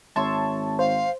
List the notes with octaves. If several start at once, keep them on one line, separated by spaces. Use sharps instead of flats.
G#1 C#5 E5 A5 C6
C5 F5